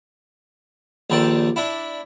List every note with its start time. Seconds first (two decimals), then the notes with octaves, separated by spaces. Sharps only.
1.10 A#1 D#2 D#3 A4 D5
1.56 D4 E4